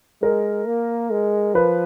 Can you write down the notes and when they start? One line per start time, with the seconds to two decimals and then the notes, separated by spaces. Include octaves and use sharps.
0.22 G#3 A#4
0.67 A#3
1.11 G#3
1.54 F3 B4